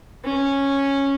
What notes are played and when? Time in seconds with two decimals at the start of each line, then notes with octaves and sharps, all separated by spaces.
0.25 C#4